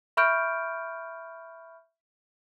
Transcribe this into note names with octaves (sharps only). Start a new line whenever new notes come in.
E5 B5 C#6 F6 G6 D7